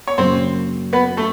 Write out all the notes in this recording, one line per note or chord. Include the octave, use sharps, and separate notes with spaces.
C#5
F#2 C#3 F#3 A#3 C4 C#4 C5
B3 B4
A3 A4